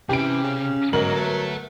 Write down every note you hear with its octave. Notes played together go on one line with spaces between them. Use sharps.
C3 E3 C#4 G4 D7
C#3
G1 G#2 F#3 A#4 D#5 F#7
A4 B4 E5